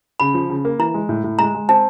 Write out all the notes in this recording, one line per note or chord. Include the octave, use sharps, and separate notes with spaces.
C#3 B5
F3
C#3
A#3
E3 A#5
G#3
A2
A2
G#3 A#5
G#3
C4 A5